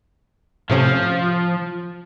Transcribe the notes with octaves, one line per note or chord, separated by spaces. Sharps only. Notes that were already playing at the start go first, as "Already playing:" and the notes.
A2 C3 F3 C#4